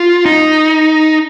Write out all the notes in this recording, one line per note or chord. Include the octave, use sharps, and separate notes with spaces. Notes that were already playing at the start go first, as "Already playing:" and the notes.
Already playing: F4
D#4